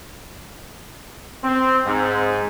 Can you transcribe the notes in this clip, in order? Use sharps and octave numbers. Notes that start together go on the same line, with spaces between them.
C4
G#2